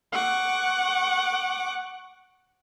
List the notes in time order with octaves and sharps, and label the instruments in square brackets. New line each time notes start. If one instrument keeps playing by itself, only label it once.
[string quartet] F#5 C#6 D6